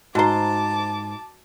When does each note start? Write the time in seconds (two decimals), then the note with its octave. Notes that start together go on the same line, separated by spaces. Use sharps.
0.15 G#2 F#4 C5 A5 A#5 D6